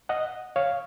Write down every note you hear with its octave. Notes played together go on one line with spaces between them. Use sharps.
D#5 F#5
C#5 F5